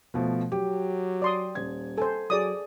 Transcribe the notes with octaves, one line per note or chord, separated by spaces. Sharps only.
B2 F3 A3
F#3 G4
D5 C6 D#6
D#1 G#6
A4 C5 G#5
F#3 G#4 D5 D#6